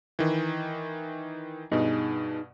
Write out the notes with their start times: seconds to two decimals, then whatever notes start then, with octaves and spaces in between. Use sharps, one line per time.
0.19 D#3 E3
1.72 G2 B2 D#4 G#4 D#5